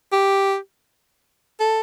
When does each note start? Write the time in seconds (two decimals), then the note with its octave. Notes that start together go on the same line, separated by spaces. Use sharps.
0.12 G4
1.60 A4